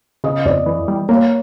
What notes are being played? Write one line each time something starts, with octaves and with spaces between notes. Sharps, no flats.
C#3 D#5
F2 D5
E3
G3
A#3 C#5